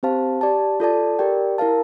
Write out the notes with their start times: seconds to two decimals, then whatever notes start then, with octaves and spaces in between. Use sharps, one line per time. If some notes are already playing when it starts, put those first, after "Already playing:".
0.03 C4 G4 C5 F5 A5
0.41 G4 D5 A5
0.80 F4 A4 D5 A5
1.19 G4 A#4 D5 G5
1.58 E4 A#4 F5 A5